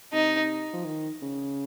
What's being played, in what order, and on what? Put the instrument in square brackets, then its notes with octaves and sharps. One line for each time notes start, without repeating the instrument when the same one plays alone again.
[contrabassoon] C3 [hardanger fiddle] D#4
[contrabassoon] F3
D#3
C#3